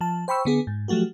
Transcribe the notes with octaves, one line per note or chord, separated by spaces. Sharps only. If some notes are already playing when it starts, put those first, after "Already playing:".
F3 A5
C5 G5 B5 C#6 E6
D3 B3 G#4
G#2
F3 F#3 A3 F#4 G4